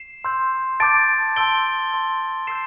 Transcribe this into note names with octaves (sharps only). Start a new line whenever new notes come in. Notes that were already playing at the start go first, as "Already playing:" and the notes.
Already playing: C7 E7
C6 E6 G6
A5 D6 G6 A6 D7
A5 C6 E6 G6 D7 G7
C6 E6 G6
C6 E6 G6 C7 E7